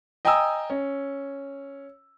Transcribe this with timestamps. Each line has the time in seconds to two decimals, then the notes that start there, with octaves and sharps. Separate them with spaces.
0.25 D#5 G5 G#5 A#5 D#6 E6
0.70 C#4